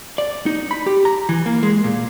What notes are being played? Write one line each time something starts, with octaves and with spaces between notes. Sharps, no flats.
D5
D#4
B5
G4
A#5
E3
A#3
G#3
A#2